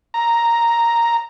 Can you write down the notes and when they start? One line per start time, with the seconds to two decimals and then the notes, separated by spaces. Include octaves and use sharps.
0.14 A#5